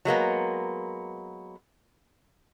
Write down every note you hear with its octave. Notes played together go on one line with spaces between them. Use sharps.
F#3 G#3 A#3 B3